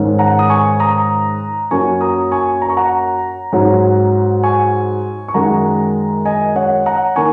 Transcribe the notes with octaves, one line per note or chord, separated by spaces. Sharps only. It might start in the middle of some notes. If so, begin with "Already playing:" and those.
Already playing: G#2 D#3 G#3 C#4
F#5 A#5
D#6
G#5 C#6
A#5 D#6
F#2 F#3 A#3 C#4 G#5 C#6
A#5 D#6
G#5 C#6
A#5
C#6
F#5 A#5
G#2 F#3 C#4
G#5 C#6
C#6
F#2 D#3 G#3 F#5 A#5
D#5 G#5
C#5 F#5
F#5 A#5
D#3 A#3 G#5 C#6